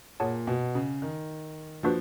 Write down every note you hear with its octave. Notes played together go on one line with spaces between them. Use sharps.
A#2 G#4 C#5 F#5 A5
B2
C#3
D#3
F3 A#3 D4 F#4 B4